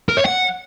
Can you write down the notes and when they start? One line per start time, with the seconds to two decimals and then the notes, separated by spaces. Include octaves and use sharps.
0.09 A#4
0.17 C#5
0.25 F#5